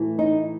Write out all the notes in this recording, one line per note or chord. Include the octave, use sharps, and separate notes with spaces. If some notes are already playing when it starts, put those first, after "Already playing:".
Already playing: A2 E3 A3
D#4